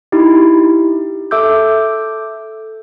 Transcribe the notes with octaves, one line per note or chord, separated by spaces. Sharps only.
D#4 E4 G4
A4 E5 D6 E6 G6